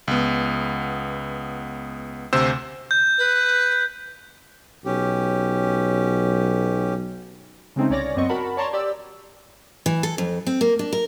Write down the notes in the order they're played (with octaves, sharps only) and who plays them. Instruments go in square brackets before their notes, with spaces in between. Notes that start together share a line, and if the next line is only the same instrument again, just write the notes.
[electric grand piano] C#2 B3
D2 C3 C5 E6
[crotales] G6
[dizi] B4
[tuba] B1 [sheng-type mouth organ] C#4 G4
[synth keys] C#3 G#3 A3 C4 C#4 D#4
C2 C#4 C#5 D5 D6 A#6
F#2 B3 C4 D#5 C#6
F#4 A#4 F#5 A5 B5
C#5 D5 A5 A#5 C6 C#6
G4 D5 E6
[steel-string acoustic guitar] E3
A4
F2
C4
A#3
D4
A#4